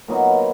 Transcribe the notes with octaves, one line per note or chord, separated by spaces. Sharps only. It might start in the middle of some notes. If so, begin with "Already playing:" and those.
A#2 F#3 B3 D#4